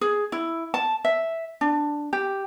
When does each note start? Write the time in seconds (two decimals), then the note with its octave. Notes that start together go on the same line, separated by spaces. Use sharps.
0.01 G#4
0.32 E4
0.74 A5
1.05 E5
1.61 D4
2.13 G4